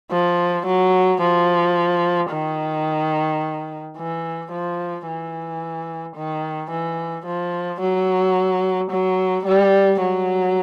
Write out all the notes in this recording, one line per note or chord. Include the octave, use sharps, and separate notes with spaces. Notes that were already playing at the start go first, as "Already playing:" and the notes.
F3
F#3
F3
D#3
E3
F3
E3
D#3
E3
F3
F#3
F#3
G3
F#3